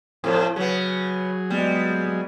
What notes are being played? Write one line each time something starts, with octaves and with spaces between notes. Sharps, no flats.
A2 F3 C4 G#4
C#3 F#3 B3 G#4
G3 G#3 B3